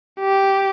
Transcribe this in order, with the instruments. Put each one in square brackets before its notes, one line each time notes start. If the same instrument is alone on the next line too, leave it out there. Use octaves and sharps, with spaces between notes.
[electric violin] G4